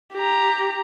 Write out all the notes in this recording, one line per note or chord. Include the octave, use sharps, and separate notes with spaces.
G4 A#5